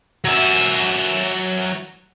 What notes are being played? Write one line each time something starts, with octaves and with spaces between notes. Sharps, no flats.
F#3 E5